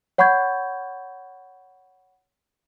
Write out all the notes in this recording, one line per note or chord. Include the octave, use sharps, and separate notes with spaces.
C#5 F#5 B5 C#6 G6 G#6